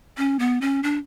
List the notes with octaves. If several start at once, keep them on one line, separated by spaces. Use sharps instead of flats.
C#4
B3
C#4
D4